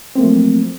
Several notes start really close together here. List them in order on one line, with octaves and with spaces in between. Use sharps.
C4 A#3 A3 F3 F#3